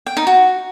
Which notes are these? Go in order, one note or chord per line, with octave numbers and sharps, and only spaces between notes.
G5
D#4
F#4